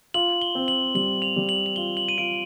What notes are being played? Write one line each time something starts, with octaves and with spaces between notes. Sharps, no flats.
F4 F#7
G7
C4
F#7
G3 F#7
F7
G3
F#7
F#7
F4 G7
F#7
D#7
F4 D7